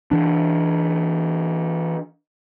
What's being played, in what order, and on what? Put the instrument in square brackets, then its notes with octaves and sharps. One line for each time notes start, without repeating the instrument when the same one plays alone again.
[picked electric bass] E3 D4